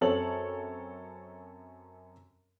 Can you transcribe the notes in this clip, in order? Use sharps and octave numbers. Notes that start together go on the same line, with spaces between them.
F#2 C4 A4 C#5 F#7